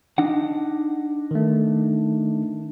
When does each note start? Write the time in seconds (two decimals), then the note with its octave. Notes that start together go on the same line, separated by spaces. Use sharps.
0.18 D4 D#4 F#5
1.31 D#3 A3